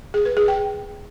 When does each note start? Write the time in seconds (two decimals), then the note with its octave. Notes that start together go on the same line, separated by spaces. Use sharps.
0.14 G#4
0.25 B4
0.37 G#4
0.48 G5